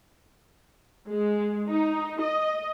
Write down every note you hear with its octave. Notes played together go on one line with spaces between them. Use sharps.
G#3
D#4
D#5